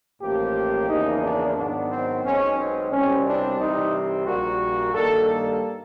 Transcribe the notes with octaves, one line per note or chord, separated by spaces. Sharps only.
A1 A2 F3 A#3 G4
E2 C#3 F3 A#3 D#4
D4
G#2 D#3 F#3 B3 D4
C4
B1 B2 G#3 C4 C#4
C4
C2 B2 G3 C4 C#4
D4
C2 C3 E3 G3 C4 D#4
A#1 A#2 G3 A#3 F#4
G2 D#3 G3 A#3 A4
A4